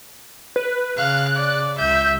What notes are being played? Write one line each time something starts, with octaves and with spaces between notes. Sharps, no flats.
B4
C#3 F5 F#6
D5
C#2 E5 G6